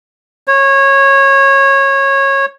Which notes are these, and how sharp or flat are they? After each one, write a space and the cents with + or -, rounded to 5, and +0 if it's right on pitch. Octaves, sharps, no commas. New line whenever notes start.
C#5 -20